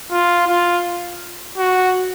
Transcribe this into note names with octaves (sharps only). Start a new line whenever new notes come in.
F4
F4
F#4